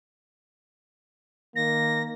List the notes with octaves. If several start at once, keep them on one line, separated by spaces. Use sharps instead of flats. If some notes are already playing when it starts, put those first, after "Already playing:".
D#3 A#3 A#6